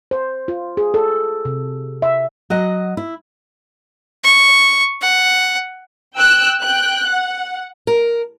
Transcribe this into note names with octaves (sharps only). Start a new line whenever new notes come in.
C5
F4
G#4
A4
C3
E5
F#3 D#5 F#5
E4
C#6
F#5
G5 E6 F#6
G5 F#6
F#5
A#4